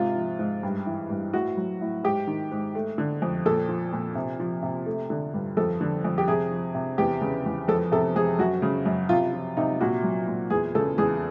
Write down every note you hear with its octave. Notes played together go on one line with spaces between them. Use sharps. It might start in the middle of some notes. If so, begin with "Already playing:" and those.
Already playing: G#2 C3 F4
F3
G#2
G2
E3
G2
A2 F#4
F#3
A2
G#2 G4
D#3
G#2
A3
D3
F2
A#2 A4
F3
A#2
C3
F3
C3
A3
D3
G2
F2 A4
D3
F2
G4
C3 G#4
F3
C3
E2 G4
C#3
E2
F2 A4
C3 A4
F2 G#4
F#2 F#4
C#3
F#2
C3 F4
F3
C3 D#4
A#2 F#4
F#3
A#2
E2 G#4
C#3 A4
E2 G#4